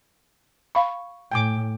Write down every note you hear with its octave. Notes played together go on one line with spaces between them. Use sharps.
F5 B5 C#6
A2 G5 G#5 D6